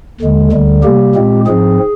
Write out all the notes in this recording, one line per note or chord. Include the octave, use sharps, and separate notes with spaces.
D#2 D3 G#3
D2 D3 G3
C3 G3 A#3 G4
A#2 G#3 C4
G#2 F3 C4 G#4